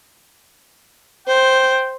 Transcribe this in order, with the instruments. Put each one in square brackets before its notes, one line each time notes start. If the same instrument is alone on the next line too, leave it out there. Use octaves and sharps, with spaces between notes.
[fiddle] C5 [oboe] G5